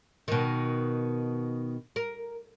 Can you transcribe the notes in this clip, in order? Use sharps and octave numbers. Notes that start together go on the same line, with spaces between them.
B2 D#3
A#4